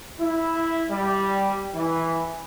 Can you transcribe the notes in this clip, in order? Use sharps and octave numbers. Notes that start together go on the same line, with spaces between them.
E4
G3
E3